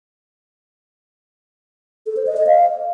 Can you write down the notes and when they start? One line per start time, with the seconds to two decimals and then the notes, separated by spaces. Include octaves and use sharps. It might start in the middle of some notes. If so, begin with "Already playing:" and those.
2.06 A4
2.17 C5
2.27 D#5
2.37 D#5
2.47 F5